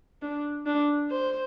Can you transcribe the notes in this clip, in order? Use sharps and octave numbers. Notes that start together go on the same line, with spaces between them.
D4
D4
C5